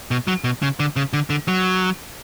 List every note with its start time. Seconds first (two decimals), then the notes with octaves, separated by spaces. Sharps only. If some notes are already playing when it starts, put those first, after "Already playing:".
0.11 B2
0.27 F#3
0.44 B2
0.62 C#3
0.80 D3
0.96 C#3
1.13 D3
1.30 D3
1.48 F#3